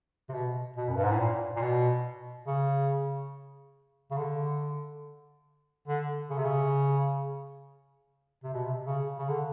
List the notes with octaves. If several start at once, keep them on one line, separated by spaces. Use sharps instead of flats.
C3
B2
B2
F#2
G2
G#2
A2
A#2
A#2
B2
C#3
C#3
D3
D3
C#3
C3
C#3
C3
B2
C3
C#3
C#3
D3